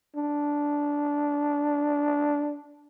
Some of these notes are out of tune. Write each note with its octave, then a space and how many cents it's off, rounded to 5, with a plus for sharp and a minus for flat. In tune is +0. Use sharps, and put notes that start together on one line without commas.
D4 -10